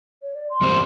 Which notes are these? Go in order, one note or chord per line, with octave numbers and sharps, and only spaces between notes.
C#5
D5
C6
E2 G3 C4